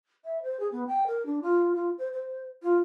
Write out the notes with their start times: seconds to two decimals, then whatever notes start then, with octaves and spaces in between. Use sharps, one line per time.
0.25 E5
0.43 C5
0.60 G#4
0.72 B3
0.87 G5
1.07 A#4
1.26 D4
1.42 F4
1.75 F4
1.98 C5
2.13 C5
2.63 F4